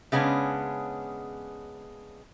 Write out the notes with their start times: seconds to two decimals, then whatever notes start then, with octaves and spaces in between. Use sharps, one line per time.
0.12 C#3 G#3 B3 C#4 D4